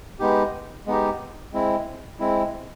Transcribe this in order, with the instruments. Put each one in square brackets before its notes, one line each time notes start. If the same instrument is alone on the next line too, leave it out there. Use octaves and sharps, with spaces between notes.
[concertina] G#3 B3 D#4 G4
G#3 B3 D#4 G4
G#3 C4 E4
G#3 C4 E4